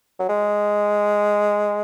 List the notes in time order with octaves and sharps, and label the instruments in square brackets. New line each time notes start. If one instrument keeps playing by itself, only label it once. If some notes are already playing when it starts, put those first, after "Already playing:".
[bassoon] F#3
G#3